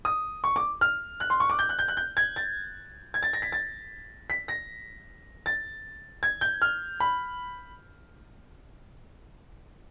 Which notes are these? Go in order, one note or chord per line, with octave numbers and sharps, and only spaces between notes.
D#6
C#6
D6
F6
F#6
C6
C#6
D6
G6
F#6
G6
F#6
G6
G#6
A6
G#6
A6
A#6
B6
A6
B6
A#6
A6
G#6
G6
F6
B5